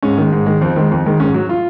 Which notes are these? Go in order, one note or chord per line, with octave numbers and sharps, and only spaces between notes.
G#2 C#4
D#3 G#3
G#2
D#3 G#3
F2 C4
D#3 G#3
F2
D#3 G#3
G#2 C#4
F#3
F4